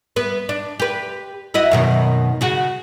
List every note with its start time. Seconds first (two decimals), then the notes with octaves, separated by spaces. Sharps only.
0.16 B3 B4
0.49 D4
0.80 G4 B4
1.54 E4 F#4 D#5
1.71 F#2 B2 D#3
2.41 C#3 F#4